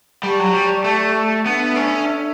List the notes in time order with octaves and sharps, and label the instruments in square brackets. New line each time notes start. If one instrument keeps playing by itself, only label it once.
[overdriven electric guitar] G3 [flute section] G4 D5 A5 C#6
[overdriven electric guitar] F#3
G3
A3
[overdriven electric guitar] B3 [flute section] D4 A4 E5
[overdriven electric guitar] C#4